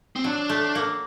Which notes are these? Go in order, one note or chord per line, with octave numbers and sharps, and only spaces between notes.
C4
F#3 D4
A3
A#3